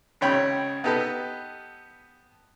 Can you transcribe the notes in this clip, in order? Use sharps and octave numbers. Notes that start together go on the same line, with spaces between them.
G#1 C#3 C#5 G5 B5
B3 D#4 G4 A4 B4